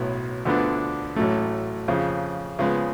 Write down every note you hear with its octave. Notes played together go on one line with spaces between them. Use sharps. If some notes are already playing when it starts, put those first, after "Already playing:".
Already playing: B1 A2 F#3 B3
D2 D3 F3 B3 D4
A1 A2 F#3 A3
F2 C#3 F3
C#3 F3 G#3 B3